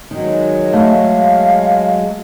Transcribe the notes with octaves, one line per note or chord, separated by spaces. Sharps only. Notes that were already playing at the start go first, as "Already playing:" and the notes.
D#3 F#3 G#3
A3 F5